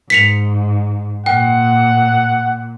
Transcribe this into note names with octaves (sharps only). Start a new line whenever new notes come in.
G#2 B6 C#7 F7
A#2 F#5 G5